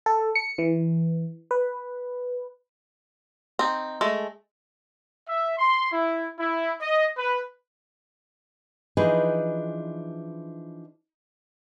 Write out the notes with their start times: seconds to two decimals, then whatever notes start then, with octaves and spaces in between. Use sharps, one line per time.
0.06 A4
0.35 C#7
0.58 E3
1.51 B4
3.59 C4 D#4
4.01 G#3 A3
5.28 E5
5.58 C6
5.92 E4
6.39 E4
6.81 D#5
7.18 B4
8.97 E3 F3 D4 D#4 G#4 B4